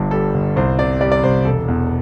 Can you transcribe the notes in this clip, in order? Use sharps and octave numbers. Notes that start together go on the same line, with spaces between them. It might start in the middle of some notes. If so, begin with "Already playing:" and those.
Already playing: G1 G2
G3 A4
G1
C2 C5
C3 D5
G3 D5
D5
C2 C5
E1 A4
E2